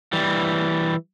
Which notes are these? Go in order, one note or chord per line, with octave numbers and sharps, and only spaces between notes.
E3 G3